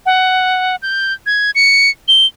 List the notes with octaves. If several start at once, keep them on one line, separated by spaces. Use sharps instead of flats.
F#5
G6
G#6
C#7
G7